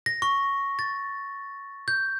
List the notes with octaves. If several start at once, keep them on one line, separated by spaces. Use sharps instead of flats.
A#6
C#6
A6
G6